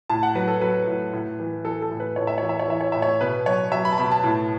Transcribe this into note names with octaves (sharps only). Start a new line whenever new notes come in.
A2 A5
F#5
F#3 B4
A4
F#3 B4
A2
A2
E3
E3 A4
A4
A2
B4
A2 C#5
E5
E3 C#5
E5
C#5
E3 E5
C#5
A2 E5
C#5
B2 B4
F#3 C#5
F#3 E5
B5
A5
B2 B5
A5
A2